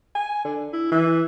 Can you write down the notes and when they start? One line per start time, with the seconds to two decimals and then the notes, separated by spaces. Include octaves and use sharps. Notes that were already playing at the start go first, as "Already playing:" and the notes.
0.15 G#5
0.45 D3
0.73 E4
0.91 E3